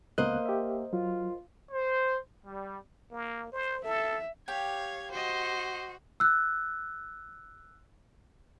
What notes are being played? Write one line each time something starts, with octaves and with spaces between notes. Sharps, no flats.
C#2 A#3 B3 A#4 C5 D#5 F#6
G4 E5
F#3 F4
C5
G3
A#3
C5
A4 E5
G4 C#5 F5 G#6
F#4 C5 D#5
E6 F#6